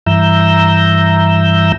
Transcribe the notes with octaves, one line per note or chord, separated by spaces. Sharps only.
G2 E3 E5 A#5 E6 G6